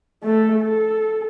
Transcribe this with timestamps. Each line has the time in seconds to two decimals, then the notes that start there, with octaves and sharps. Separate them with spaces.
0.23 A3 A4
0.59 A4